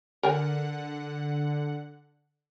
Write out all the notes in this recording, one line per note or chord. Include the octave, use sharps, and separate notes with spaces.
D3 A#4 F#5 G#5